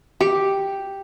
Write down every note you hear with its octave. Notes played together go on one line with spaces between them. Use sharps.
G4